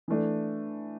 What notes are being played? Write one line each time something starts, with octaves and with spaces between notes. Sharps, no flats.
E3 A3 D4